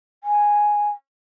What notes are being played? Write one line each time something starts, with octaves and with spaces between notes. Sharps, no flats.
G#5